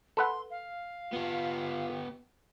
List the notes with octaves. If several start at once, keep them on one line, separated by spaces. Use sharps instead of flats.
A4 B4 F#5 C6
F5
B3 F4 G4